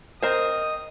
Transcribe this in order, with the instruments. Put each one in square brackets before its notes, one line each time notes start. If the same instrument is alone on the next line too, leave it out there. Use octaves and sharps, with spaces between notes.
[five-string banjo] C4 A#4 C5 [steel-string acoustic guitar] D#5 [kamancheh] D#6